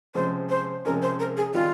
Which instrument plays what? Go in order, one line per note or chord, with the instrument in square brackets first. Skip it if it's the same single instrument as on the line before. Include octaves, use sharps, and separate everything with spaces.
[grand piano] C3 F3 G#3 C#4 [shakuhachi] C5
[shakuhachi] C5
[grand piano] C3 F3 G#3 C#4 [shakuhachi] A#4
[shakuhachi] C5
A#4
G#4
[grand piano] D#3 G3 C4 [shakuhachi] F4